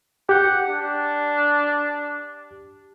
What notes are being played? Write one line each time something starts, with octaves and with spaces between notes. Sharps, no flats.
G4 F#5 G6
D4